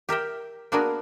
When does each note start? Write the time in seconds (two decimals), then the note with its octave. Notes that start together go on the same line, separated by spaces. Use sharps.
0.09 G4 A#4 E5 G5
0.72 A#3 B3 D4 F#4 G#4 A#4